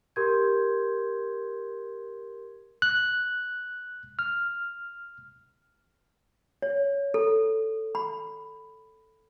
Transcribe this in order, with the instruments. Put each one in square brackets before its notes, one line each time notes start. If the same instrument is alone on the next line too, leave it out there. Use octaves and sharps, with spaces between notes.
[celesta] G4 A#4 C6 G6 G#6
[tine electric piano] F#6
F6
[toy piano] C#5
A4
B5